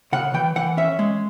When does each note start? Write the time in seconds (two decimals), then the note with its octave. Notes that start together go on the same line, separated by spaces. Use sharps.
0.13 C#3 F#5
0.34 E3 G5
0.56 E3 F#5
0.77 C#4 E5
0.99 G#3